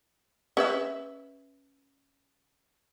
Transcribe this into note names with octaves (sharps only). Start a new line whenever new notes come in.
C#4 B4 E5